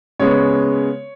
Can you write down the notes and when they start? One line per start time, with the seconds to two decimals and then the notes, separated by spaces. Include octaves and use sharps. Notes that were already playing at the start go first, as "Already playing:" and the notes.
0.20 C#3 G#3 B3 C#5